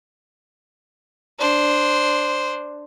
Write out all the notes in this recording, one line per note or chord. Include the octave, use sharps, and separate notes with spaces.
D4 C5